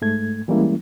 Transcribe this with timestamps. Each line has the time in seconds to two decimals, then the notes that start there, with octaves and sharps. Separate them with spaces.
0.02 G#2 A3 G#6
0.48 E3 G3 G#3 A#3 C#4 E4